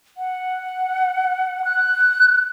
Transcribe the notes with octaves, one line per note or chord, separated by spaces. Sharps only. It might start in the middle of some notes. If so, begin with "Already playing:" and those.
F#5
F#6